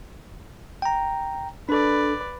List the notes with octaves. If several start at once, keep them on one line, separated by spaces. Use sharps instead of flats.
G5 A#5
D4 A4 B4 D5